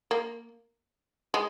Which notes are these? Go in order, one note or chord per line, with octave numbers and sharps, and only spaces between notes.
A#3
G#3